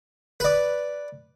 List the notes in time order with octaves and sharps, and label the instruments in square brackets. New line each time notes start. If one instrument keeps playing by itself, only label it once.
[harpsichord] B4 D5